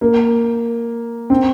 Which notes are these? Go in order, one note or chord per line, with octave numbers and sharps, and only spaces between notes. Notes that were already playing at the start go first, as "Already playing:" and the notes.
A#3
C4